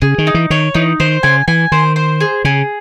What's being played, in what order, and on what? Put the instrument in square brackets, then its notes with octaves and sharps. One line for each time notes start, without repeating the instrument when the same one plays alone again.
[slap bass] C#3 [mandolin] G#4
[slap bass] D#3
[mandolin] D#4
[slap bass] E3
[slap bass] D#3 [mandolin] C#5
[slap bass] E3 [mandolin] D#4
[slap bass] D#3 [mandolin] C5
[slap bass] C#3 [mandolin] G#5
[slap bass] E3 [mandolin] G#5
[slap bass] D#3 [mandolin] C5
[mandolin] C5
G#4
[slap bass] C#3 [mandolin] G#4